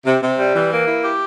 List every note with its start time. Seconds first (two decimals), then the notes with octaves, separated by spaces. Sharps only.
0.06 C3
0.22 C3
0.39 G3
0.55 E3
0.72 A#3
0.87 E4
1.04 G4